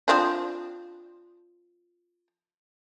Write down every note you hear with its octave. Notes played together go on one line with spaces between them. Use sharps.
F3 C4 D4